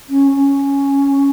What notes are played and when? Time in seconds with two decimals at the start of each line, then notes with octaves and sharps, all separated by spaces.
0.09 C#4
0.35 C#4